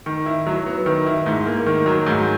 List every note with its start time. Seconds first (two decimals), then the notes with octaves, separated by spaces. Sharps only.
0.06 D#3
0.26 E4
0.47 F#3
0.66 B3
0.86 D#3
1.06 E4
1.26 G#2
1.46 A#3
1.66 D#3
1.86 F#3
2.06 G#2